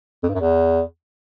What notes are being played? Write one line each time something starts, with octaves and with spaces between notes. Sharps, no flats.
F2
G2
F#2
E2